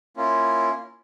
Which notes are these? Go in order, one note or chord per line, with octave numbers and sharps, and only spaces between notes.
A#3 C#4 E4 F4